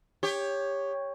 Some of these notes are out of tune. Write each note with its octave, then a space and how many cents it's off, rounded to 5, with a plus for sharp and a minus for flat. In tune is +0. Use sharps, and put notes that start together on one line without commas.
G4 +20 C#5 +0